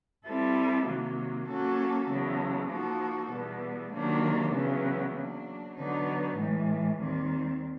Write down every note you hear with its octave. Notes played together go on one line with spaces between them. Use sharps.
G3 C4 E4 A4
C3 D#3 F#3 A#3
F#3 A#3 C#4 F#4 A4
E2 C#3 F#3
F3 A#3 D#4 F#4 A4
E2 B2 G3 B3
C3 D#3 F#3 A#3 D4
E2 C#3 F#3 B3
F#3 A#3 D4
D3 F#3 B3 D#4
A2 E3 G#3
D#2 D#3 G3 C4